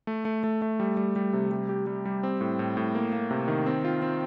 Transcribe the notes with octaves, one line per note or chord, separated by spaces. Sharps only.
A3
A3
A3
A3
G3
G3
G3
C3
G3
G4
G3
G3
C4
A2
A2
A2
A#3
A#3
C3
D#3
C4
F4
C4